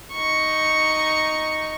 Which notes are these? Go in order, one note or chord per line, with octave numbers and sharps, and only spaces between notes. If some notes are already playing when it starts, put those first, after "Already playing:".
D#4 C#6